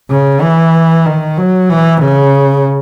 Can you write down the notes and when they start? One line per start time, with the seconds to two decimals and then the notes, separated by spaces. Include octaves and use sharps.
0.10 C#3
0.42 E3
1.06 D#3
1.37 F#3
1.70 E3
2.01 C#3